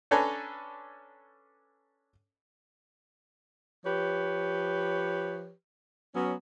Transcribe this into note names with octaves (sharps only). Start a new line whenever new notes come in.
C#4 D4 A4 B4 G#5 A#5
F3 G4 B4 C#5
F#3 B3 C#4